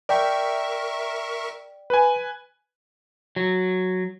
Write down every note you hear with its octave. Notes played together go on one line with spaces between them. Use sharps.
A#4 D5 E5 G5 C#6
B4 G#5
F#3